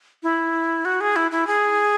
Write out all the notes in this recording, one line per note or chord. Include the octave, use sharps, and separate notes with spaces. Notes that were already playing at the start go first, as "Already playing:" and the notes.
E4
F#4
G#4
E4
E4
G#4